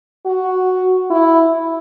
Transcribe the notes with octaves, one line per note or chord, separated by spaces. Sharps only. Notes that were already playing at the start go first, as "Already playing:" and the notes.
F#4
E4